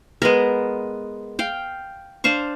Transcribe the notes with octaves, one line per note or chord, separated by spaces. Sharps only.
G#3 B3 A#4
F5 G5
D4 C5 F5 C#6